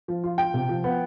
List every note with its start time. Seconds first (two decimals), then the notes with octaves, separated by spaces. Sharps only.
0.08 F3
0.24 F4
0.38 F4 G5
0.54 C3
0.69 F3
0.84 B3